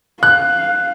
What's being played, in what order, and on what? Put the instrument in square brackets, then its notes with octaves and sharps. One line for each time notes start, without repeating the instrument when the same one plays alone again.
[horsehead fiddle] F5 [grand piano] F#6